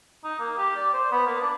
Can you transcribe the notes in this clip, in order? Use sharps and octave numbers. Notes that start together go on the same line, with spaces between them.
D#4
A#3
G4
D5
C5
B3
A#3
D4